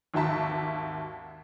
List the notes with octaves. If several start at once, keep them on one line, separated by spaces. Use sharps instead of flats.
G#1 D#2 F#4 E5 A5 B6